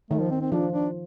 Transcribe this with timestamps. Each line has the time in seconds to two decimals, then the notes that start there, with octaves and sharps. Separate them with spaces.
0.10 D#3 A3
0.21 F3
0.31 C4
0.41 C4
0.52 F3 D4
0.73 D4